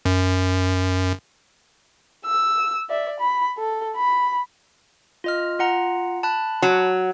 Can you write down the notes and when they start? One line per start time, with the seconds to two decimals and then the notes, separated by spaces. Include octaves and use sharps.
0.05 F#2
2.25 E6
2.90 D5 E5
3.20 B5
3.59 A4
3.96 B5
5.24 F4 D#5 F6
5.59 F4 F#5 A#5
6.23 A5 B5 F#6
6.62 F#3